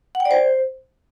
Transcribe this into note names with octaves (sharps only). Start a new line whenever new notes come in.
F#5
G5
D5
C5